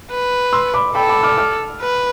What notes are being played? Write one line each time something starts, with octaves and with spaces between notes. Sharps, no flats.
B4
C6 E6
B5 D6
A4 G5 B5
B5 D6
D6 F6
D6 F6
B4